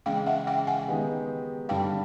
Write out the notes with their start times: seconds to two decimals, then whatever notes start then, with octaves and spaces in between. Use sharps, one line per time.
0.06 C#3 E3 G#3 C#4 F5 G5
0.26 E5 F#5
0.47 F5 G5
0.67 F#5 G#5
0.88 D#3 G#3 B3 D#4 G4
1.69 G2 D3 G3 F5 G5